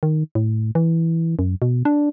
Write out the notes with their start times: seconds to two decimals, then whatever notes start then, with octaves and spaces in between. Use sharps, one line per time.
0.03 D#3
0.35 A2
0.75 E3
1.39 F#2
1.62 B2
1.85 D4